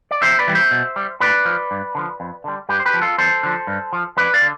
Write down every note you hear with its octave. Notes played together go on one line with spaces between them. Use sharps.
D5
F2 C5 E5
B4 D5
E3 G3
C5 E5
B2
G3
A2 B4 D5
F3
G2
D3 F3
F2
D3 G3
G2 G4 B4
C5
G4 B4
F3
F4 A4
E2 A4 C5
D3 F3
G2
F3
F2 B4 D5
D5 F5
D3